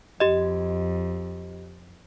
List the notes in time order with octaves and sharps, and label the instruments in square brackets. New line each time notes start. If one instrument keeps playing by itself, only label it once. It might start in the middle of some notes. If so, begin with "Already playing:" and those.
[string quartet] F2 [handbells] G4 D#5